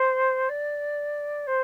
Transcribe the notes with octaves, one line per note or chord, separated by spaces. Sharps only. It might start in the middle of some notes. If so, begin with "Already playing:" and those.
Already playing: C5
D5
C5